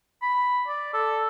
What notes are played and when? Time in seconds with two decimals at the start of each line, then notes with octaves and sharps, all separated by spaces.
0.22 B5
0.68 D5
0.94 A4